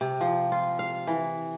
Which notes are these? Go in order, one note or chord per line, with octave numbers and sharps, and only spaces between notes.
C3
F3
F4
F5
E3